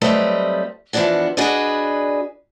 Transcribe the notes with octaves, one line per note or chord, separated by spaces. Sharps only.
F#3 G3 A3 C4 B4 D#5
E3 F3 B3 D4 F#4
D4 F#4 G#4 B4 D5 D#5